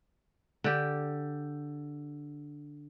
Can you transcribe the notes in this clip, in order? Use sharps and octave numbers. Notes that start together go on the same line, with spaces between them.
D3 G4